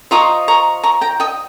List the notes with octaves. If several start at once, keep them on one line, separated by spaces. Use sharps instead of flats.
F4 C5 D#5 A#5 C#6
A#5 C#6
A#5 C#6
G5 A#5
D#5 G5